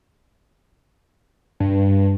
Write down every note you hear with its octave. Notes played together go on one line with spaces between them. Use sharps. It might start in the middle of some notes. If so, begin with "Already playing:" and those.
G2